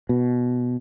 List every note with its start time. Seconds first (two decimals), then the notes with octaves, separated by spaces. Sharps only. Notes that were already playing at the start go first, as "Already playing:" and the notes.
0.09 B2